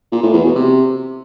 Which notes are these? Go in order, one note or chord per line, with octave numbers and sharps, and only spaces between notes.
A#2
A2
E2
B2
C3